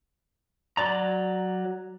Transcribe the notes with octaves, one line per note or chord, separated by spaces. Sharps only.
F#3 D5 A#5